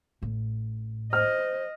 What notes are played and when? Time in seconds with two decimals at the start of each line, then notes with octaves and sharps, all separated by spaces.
0.22 A1 A2
1.13 C5 D#5 F6